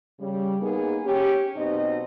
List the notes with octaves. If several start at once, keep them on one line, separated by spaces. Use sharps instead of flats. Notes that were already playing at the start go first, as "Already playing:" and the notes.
C#3 G3
A#3 B3 D#4 G#4
C#4 G4
F#2 B2 C4 D#4 D#5